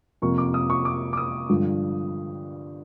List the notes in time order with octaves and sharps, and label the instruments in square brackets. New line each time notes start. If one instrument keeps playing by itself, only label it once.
[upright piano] F2 C3 F3 A#3 C#6
D6
D#6
C#6
D6
D6
D#6
G2 D3 F3